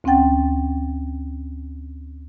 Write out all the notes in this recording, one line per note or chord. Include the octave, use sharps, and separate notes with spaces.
D2 C4 C#4 F#5 G5 A6